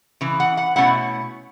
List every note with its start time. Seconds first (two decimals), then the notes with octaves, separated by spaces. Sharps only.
0.21 C#3 E3
0.40 F#5
0.57 F#5
0.76 B2 A3 C#4 E4 F#5